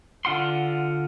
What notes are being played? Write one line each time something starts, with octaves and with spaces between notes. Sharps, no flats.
D3 F4 F#5 C6